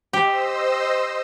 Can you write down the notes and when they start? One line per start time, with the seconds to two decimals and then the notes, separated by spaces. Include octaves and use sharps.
0.13 G4 C5 D#5 E6